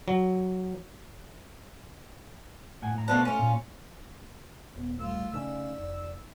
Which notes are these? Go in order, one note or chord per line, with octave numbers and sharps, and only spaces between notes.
F#3
A2 F#5 G#5
A2 A#5
B2 F3 A3 B3 D4 B4
A3 C#4 F4
A#2
D#1 B3
B1 G3 A3 F4 E6
C#3 A3 C#4 D#4 D5 E6 B6
F1